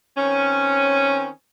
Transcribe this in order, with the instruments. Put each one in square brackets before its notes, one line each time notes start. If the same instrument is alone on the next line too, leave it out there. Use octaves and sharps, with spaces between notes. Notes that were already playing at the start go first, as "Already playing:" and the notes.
[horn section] D#3 C4 C#4